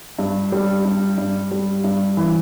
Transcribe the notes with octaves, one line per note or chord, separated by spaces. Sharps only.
G2
G3
G2
G2
G3
G2
E3